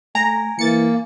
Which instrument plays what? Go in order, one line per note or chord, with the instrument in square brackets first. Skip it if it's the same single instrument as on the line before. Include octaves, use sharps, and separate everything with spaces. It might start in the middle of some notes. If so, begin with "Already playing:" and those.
[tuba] A3 [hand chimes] G#5 [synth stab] A#5
[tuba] E3 [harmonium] A#3 [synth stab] A6 C#7